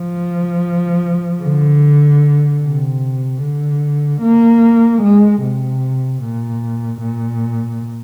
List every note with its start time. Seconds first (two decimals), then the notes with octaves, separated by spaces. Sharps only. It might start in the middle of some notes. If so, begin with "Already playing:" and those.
Already playing: F3
1.42 D3
2.62 C3
3.42 D3
4.21 A#3
5.02 G#3
5.42 C3
6.22 A#2
7.01 A#2